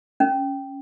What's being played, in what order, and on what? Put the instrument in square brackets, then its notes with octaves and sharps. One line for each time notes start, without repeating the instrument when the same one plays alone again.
[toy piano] C#4